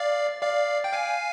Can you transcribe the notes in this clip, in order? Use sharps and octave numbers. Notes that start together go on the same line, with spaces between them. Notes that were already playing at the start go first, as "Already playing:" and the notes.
Already playing: D5 F5
D5 F5
G5
F5 G#5